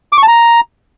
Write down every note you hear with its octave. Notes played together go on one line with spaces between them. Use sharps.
D6
C#6
A5
A#5